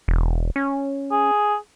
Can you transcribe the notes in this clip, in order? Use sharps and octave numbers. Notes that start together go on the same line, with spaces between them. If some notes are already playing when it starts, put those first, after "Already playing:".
E1
C#4
G#4